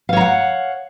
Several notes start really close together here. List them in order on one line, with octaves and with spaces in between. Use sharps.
F5 C#5 A#5 F#5